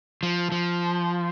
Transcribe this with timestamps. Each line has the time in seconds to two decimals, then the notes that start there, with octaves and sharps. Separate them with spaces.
0.23 F3
0.52 F3